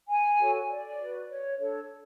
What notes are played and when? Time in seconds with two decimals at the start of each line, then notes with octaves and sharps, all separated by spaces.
0.09 G#5
0.38 F#4 A4 C#5
0.69 D5
0.98 F#4 B4
1.28 C#5
1.58 D4 A4 C#5